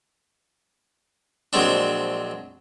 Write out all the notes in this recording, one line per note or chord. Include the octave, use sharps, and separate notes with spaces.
A#1 F#3 G#3 C4 D4